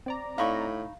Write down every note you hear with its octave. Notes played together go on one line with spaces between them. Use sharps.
C4 D5 A#5
A2 D#4 F5 B5 C#6